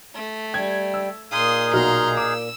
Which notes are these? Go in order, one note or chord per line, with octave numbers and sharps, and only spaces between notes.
A3
G3 G5 G#6
E6
A#2 D#4 G#4 F5 C6 D#6
B1 F#4 A#5 C6 F6
D6 E6